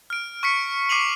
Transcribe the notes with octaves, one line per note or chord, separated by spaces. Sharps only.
F6 D7
C#6 F6 B6 C#7
C#6 D6 C7 D#7 F7 F#7